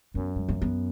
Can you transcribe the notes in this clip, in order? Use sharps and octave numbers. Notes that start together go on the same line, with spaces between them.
F#2 B3
G#3
A#3
B3